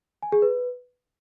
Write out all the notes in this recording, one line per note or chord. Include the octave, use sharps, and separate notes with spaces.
G#5
G#4
B4